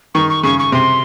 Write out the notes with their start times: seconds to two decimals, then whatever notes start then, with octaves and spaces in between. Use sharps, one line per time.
0.14 D#3 C#6
0.29 C#6
0.43 C#3 C#6
0.59 C#6
0.72 C3 C6